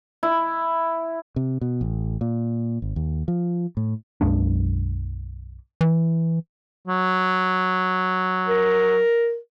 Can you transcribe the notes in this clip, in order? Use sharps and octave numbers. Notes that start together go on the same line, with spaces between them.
E4
C3
B2
A1
A#2
G#1
D#2
F3
A2
B1 F#2 G#3 D4
E3
F#3
A#4